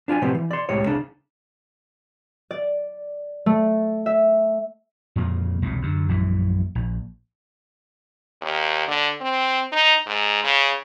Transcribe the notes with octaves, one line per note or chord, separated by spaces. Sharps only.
D4 F4 G5 G#5
A2 C3 F3 B3 C4 G4
E3
D5 C6
C2 A2 G3 G#3 C#5
C2 C#3 D4
D5
A3
E5
F2 A#2 C#3 A#3
E1 C2 A#2
F#2 D3
A#1 F#2 E3
A#1
D#2
D3
C4
D#4
G#2
C#3